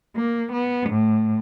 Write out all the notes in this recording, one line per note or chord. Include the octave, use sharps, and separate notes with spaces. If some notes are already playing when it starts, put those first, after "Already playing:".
A#3
B3
A2